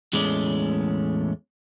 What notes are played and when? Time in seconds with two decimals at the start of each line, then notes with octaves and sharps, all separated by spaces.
0.13 E2 A2 G#3 A3 C#4 D5